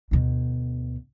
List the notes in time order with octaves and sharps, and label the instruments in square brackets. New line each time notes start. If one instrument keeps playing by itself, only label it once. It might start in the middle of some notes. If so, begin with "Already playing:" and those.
[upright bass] D2 B2